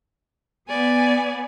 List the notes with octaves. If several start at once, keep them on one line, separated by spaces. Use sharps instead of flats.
B3 D5 G#5